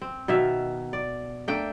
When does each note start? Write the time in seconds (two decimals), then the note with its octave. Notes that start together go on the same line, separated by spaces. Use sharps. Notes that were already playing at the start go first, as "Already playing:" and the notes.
0.01 C4
0.28 B2 D#3 E5 F5
0.93 D5
1.48 A3 A#3 D4 G5